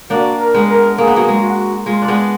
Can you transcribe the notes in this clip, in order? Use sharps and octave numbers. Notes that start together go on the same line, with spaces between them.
A#3 D4 F#4
A#4
G#3 B3
A#4
A#3 G#4
B3
F#3 A#3
G#3
F#4
G#3 F4
D4
G#3 B3